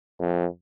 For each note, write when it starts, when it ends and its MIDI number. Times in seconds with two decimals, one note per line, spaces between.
0.20 0.45 41